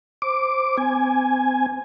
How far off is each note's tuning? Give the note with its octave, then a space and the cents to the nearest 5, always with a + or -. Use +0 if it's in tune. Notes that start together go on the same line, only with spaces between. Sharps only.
C5 +5 D6 +0
C4 -35 G#5 +0